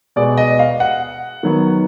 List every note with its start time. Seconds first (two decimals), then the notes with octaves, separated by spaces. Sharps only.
0.16 B2 G#3 B3 D5
0.38 D#5
0.59 F5
0.80 F#5
1.43 D#3 F#3 B3